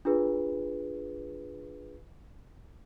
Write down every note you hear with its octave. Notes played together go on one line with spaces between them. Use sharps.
D4 F4 G#4 B4